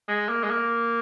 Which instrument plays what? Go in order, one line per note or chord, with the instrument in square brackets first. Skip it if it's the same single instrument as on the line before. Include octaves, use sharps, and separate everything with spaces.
[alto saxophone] G#3
A#3
G#3
A#3